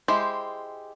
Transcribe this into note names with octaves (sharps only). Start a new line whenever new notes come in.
G#3 E4 G4 C5